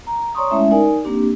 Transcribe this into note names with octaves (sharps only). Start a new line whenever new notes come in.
A#5
C#5 D5 A#5 C6 C#6 D#6
G#3 A3 C#4 E4 E5
D#4 A#4 D5 G#5
A#3 C4 D4 G4